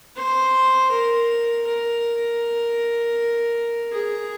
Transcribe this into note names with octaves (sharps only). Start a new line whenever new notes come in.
C5
A#4
A#4
G#4